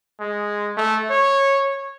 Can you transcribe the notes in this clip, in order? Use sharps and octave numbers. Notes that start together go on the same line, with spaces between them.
G#3
A3
C#5